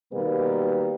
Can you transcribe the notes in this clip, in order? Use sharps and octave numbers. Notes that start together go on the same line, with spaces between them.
B2 D#3 G3 A#3 B4